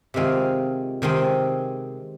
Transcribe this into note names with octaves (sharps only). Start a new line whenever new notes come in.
C3 D#3 G#3 C4 F4
C3 D#3 G#3 C4